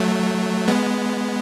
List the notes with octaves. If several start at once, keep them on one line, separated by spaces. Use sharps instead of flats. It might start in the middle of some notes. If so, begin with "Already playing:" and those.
Already playing: F#3 A3
G#3 B3